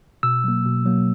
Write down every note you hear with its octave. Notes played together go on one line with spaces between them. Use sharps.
B2 E6
F#3 A#3
B2
F#3 A#3